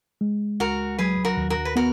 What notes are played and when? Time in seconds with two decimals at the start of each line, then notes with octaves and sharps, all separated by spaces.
0.21 G#3
0.60 C#2 F#4 A#4
0.99 F#3 G#4 B4
1.25 F#4 A#4
1.37 D#2
1.50 F#4 A#4
1.65 B4
1.76 B3 F#4 A#4